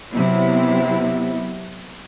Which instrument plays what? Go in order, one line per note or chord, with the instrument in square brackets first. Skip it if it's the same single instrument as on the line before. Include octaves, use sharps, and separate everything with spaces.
[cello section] C3 F#3 B3 E4